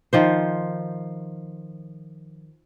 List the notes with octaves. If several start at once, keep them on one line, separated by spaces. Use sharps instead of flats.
D#3 F3 C5